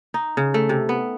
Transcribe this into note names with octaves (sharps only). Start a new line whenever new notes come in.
D#4
C#3
A3
C3
B3